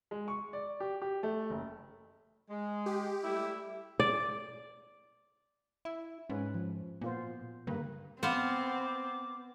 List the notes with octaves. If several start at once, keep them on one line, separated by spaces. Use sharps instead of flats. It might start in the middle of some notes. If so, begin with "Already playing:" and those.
G#3
C#6
D5
G4
G4
A3
F#1
G#3
G4
G3 A3 E4
D5
E4
G#2 C#4 B4
F3
A#2 B3 F4 C5
G2 D3 A#3 B4
B3 C4 C5 F5 D6